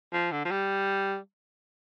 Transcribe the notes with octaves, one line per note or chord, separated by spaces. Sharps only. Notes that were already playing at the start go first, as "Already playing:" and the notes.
F3
D3
F3
G3